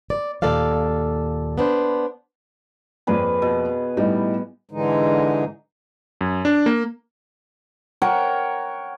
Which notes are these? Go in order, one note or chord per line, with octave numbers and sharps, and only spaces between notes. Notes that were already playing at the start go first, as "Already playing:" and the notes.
D5
D#2 A#2 A4 D5 F5
B3 D4 C5
F2 A#3 G#4 B4 D5
B2
A2 G3 D#4
G#2 D3 E3 G#3 D#4
F#2
D4
A#3
A#4 C#5 F#5 G5